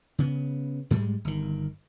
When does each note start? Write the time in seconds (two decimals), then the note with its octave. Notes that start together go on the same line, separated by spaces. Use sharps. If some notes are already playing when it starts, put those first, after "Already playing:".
0.19 C#3 B3
0.91 G#2 G3 G#3
1.25 G1 D#3